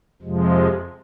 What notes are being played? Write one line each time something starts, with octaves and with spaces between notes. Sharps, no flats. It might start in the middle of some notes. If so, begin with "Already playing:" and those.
F2 C3 F3 G#3